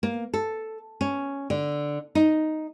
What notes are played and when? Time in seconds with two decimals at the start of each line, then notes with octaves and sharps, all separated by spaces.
0.03 A#3
0.34 A4
1.01 C#4
1.50 D3
2.15 D#4